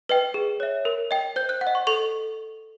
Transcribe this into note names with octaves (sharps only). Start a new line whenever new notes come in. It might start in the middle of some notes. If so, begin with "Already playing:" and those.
B4 D#5 G5
G#4
C#5 E5
A#4
D#5 G5
C5 G6
F#6
F#5
D#5
C#6
A4 C#6